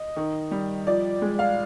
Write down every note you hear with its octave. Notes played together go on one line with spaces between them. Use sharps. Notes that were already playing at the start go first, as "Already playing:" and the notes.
Already playing: D#5
D#3
G3
F3 D5
G#3
F5